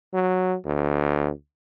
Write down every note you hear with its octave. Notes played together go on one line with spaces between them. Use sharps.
F#3
D2